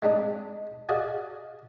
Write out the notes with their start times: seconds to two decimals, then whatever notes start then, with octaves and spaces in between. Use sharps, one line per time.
0.02 G#3 C4 D4 D#4
0.89 F#4 G#4 D5 D#5 F5